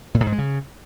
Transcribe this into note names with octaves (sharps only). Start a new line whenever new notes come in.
A#2
A2
G#2
G#3
C#3